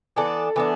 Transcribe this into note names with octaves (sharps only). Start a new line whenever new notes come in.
E3 B3 D4 A4
E3 B3 D4